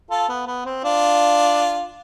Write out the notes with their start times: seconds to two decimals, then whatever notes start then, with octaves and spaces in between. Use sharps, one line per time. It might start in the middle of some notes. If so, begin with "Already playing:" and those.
0.11 F4 A4
0.29 B3
0.47 B3
0.65 C4
0.84 D4 F4